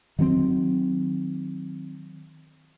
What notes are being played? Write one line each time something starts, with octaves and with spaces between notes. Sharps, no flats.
D#3 F#3 B3 C4